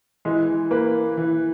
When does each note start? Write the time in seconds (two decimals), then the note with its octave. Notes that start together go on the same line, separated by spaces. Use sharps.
0.25 E3 G#3
0.71 A#3 B4
1.17 E3